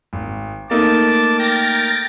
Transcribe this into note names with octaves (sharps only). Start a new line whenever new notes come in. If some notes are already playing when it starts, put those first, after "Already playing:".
G#1
A3 A#3 D#4 A5 D6
A#4 G5 A6 A#6